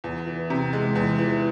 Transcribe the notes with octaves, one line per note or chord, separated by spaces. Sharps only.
E2
E3
C3
G#3
E2
E3